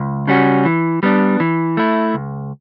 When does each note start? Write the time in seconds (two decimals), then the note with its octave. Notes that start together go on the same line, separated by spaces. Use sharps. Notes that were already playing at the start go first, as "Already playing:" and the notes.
Already playing: C#2
0.27 C#3 G3 C#4 F#4
0.65 E3
1.03 G3 B3 D4
1.40 E3
1.77 A3 E4
2.14 C#2